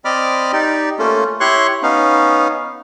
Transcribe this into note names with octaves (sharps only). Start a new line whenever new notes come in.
C4 D5 D#5 B5 D6 F6
D#4 G4 D5
A3 A#3 C#4 F4 A4
E4 G4 C#5 C6 C#6 F#6
B3 C#4 D#4 F5